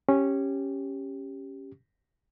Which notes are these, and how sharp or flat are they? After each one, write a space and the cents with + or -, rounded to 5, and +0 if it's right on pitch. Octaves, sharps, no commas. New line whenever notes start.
C#4 -10 G4 +0